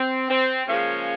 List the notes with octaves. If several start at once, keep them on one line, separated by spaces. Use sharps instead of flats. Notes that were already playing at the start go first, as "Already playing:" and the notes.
Already playing: C4
C4
C#3 F3 G#3 A#3 C#4